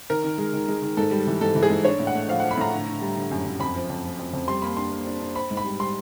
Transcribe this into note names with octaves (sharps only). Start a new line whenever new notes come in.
D#3 A#4
D#3
G#3
D#3
G#3
D#3
G#2 A4
G3
E3
G#2 A4
E3
G#4
G#2
D4 C#5
A2
F#5
A3
F3 F5
F3 F#5
B5
A2 A#5
D3
D3
G3
D3
F#2
F#2
F2 B5
F3
F2
F3
F2
F2
G3 C6
A#3 B5
D4 C6
A#3
D4
D4
C4 B5
G#2
B5
G3
G3 C6